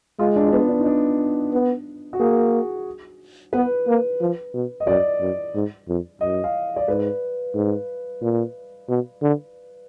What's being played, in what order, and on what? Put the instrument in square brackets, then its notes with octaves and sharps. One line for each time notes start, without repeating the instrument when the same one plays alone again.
[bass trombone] G#3 [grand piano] F4
[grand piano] D4
D4
B3
D4
D#4
D4
[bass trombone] B3
[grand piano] F#4
[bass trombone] A#3 [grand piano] G#4
[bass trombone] B3 [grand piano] B4
[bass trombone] A#3
F3
B2
[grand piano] D#5
[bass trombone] F#2 [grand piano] D5
[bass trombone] F#2
G#2
F2
[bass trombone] F#2 [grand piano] D#5
[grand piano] F5
D5
[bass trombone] G#2 [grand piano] B4
[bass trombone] G#2
A#2
B2
D3